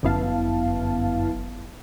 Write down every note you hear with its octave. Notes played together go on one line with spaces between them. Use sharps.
G1 F#2 B3 E4 F5 A5